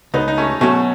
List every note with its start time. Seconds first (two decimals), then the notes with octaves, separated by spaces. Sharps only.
0.14 C#2 B3 D#4
0.28 D#4
0.38 A3 C#4
0.61 B2 F#3 A3 C#4